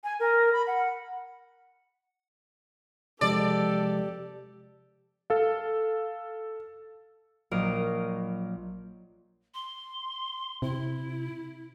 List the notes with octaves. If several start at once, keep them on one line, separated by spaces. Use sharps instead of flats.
G#5
A#4
B5
F#5
C3 F3 G#3 G4 A4 D5
A4 F5
A#1 F#3 A#3 D#5 F5 D7
C6
C3 E4